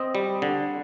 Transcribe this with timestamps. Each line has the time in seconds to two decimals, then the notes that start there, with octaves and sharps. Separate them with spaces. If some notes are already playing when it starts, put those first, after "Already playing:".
Already playing: C4 D#5
0.15 G3
0.42 D3